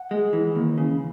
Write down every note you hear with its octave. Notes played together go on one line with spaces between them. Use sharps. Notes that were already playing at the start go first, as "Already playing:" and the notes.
Already playing: F#5
G#3
E3
D#2
C#3